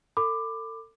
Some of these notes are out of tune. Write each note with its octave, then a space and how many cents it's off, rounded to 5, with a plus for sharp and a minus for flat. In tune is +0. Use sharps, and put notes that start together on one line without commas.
A4 +35 B5 +25 D6 +15